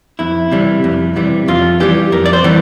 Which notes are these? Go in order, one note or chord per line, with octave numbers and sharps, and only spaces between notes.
F2 E4
C3 E3 G3
F2
C3 E3 G3
F2 F4
E3 G3 G4
F2 A#4
D5
C5
E3 G3